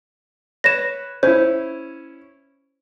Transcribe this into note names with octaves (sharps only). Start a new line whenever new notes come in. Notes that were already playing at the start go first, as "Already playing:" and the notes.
B4 C#5 A#6 E7
C#4 E4 C5